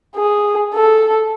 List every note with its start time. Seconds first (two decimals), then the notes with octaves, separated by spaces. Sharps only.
0.16 G#4
0.74 A4